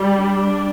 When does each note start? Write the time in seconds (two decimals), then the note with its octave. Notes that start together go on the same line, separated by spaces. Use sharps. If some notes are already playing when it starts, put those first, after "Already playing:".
Already playing: G3
0.19 D4